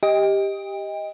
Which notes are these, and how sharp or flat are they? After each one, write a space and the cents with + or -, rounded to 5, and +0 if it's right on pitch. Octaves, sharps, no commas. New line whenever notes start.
G4 +5 D#5 +15 G5 +35